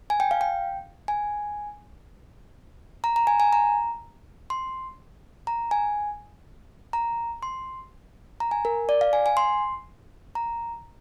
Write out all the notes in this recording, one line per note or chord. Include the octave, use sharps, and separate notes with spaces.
G#5
G5
F5
G5
G#5
A#5
A#5
G#5
G#5
A#5
C6
A#5
G#5
A#5
C6
A#5
G#5
A#4
D5
F5
G#5
G#5
C6
A#5